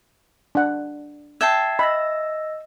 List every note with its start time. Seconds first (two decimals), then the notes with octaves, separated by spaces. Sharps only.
0.55 D4 F#5
1.41 E5 G5 A5 G#6 C7
1.79 D#5 B5 E6 A#6